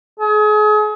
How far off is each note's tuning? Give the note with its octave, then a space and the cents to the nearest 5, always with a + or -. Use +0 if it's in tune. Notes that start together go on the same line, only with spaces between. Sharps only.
G#4 +35